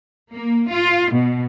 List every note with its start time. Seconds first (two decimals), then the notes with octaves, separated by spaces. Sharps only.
0.30 A#3
0.68 F4
1.09 B2